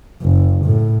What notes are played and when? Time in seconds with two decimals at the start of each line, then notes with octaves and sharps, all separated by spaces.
0.23 F#1
0.65 A2